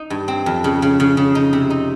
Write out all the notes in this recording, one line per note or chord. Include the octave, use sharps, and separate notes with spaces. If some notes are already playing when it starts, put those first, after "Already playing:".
Already playing: D#4
G2
C4
F2
C#3
C#3
C#3
C#3
D#4
C3
D#4